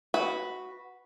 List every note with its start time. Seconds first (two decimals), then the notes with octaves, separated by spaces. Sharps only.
0.14 F#4 B4